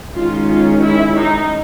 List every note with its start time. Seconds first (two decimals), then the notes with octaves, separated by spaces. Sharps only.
0.14 D#3 G#3 C#4 F4
0.48 F4
0.82 E4
1.16 D#4